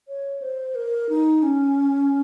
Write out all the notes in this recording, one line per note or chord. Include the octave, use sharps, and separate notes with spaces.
C#5
C5
A#4
D#4
C#4